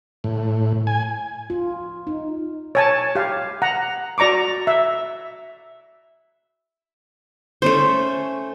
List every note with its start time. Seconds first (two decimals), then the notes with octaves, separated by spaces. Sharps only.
0.24 A2
0.87 G#5
1.50 F4
2.07 D#4
2.75 C#5 G#5 A5
3.15 G4 F5
3.62 F#5 A#5
4.18 F#4 D5 A#5 C#6 D6
4.67 E5
7.62 A3 C#4 C5